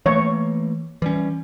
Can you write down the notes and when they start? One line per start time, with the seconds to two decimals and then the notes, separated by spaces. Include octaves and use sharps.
0.06 E3 A3 A#3 C#5
1.02 E3 G3 C#4